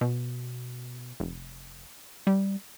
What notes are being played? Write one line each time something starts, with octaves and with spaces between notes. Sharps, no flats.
B2
F1
G3